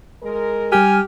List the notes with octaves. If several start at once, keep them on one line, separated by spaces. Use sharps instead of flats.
G#3 A#4
G3 G4 G#5 F6